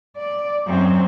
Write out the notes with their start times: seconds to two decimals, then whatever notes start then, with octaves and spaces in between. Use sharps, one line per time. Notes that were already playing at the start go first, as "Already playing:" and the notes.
0.17 D5
0.66 F#2 C4